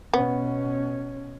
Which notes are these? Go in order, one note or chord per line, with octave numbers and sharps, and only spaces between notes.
B2 B3 C#4